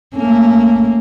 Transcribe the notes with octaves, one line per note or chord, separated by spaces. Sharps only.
A3 A#3 C#4